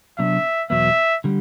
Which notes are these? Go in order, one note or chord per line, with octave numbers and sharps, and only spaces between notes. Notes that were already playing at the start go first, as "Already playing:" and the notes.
C3 F#3 B3 D4 E5
E2 B2 F#3 B3 E5
D3 G3